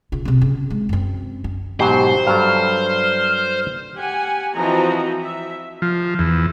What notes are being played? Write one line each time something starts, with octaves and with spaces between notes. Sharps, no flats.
C#3 F4
C3 C4
C#3
G#3
F#2 C4
C#4
G#2 B2 F#3 G4 C5
G2 F#3 A4 F6
G4 F#5 G#5
E3 F3 C4 F#4 D#5 A#5
E5
F3
E2